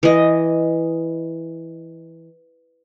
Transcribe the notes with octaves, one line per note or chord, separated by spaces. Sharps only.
E3 D#5